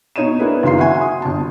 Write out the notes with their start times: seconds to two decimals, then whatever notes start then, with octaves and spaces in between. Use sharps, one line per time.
0.16 B2 D#4 C#5 D#5 D#7 E7
0.39 A#3 B3 D4 E4 G#4 B4
0.63 F#1 D#3 F#3 F5 C6 C7
0.78 F#4 E5 F#5 G#5 C6
1.01 D#6
1.22 G1 A5